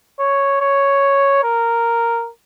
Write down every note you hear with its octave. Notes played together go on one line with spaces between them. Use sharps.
C#5
C#5
A#4